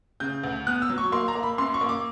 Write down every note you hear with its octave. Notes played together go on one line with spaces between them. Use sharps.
C#3 G6
D2
B3 F#6
E6
F#3
C#6
A#3 C6
A#5
A#3
B5
F#2 C6
C#6
A#3
D6